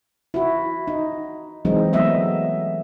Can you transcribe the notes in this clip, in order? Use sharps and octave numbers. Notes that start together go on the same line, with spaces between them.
E4 F#4
D#4
E3 F#3 G#3 C4 D#4
F#3 A3 B3 D#5 E5